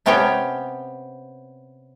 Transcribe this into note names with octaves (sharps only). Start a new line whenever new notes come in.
C3 B3 C#4 G4 C#5 G5